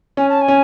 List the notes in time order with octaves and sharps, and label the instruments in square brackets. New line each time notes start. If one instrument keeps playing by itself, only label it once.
[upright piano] C#4 [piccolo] G#5
[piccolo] A5
G#5
[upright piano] C#4